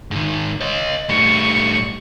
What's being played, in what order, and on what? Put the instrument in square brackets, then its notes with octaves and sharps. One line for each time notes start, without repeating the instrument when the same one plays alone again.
[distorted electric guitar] G#2 D#3
C#5 D#5
[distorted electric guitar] A2 G3 [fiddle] C#6